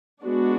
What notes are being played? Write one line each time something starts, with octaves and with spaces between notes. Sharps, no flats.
G#3 B3 D4 F#4